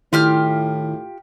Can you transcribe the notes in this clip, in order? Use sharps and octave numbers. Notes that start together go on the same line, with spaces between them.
A2 D#3 E4 F4 G4 F6